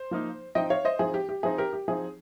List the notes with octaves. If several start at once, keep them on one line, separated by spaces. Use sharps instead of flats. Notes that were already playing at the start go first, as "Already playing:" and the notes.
Already playing: C5
F3 A#3 D#4
F3 C4 D#4 D#5 G5
C#5 F5
C5 D#5
F3 C4 D#4 G#4
G4
G4
F3 C4 D#4 G#4
G4 A#4
G4
F3 C4 D#4 G#4